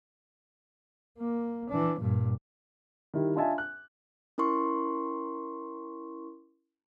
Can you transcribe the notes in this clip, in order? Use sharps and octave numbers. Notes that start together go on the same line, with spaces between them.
A#3
E3 D4
G2 A#2
D#3 G3 E4
D4 F4 D#5 E5 G#5 A5
F#6
C#4 E4 A#4 C6 C#6